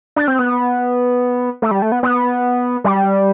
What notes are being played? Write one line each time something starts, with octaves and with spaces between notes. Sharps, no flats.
D4
C4
B3
A3
G3
A3
B3
B3
G3